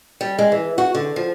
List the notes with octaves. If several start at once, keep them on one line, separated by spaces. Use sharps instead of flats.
G3
G#3
E3
F#4
D3
F3